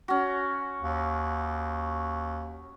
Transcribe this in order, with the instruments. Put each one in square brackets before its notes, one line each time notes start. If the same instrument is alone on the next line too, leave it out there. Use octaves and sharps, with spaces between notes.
[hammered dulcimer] C#4 F#4
[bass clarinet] D#2